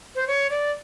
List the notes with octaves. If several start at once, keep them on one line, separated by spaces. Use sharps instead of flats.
C5
C#5
D5